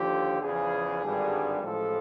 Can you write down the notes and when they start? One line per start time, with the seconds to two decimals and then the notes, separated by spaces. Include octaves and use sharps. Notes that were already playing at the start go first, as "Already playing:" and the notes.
Already playing: D#2 D3 F3 G4
0.41 E2 C#3 F3 G#4
1.02 G#1 G2 D3 G3
1.63 A1 A2 F3 G#3 A4